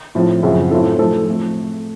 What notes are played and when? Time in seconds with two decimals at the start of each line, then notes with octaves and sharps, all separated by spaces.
0.15 A2 F3 C4
0.43 F#2 C#3 F3 C4 F#4
0.71 A2 F#3 C4 F4 A4
0.99 F3 A3 D#4 A4 C5
1.28 F3 A3 C4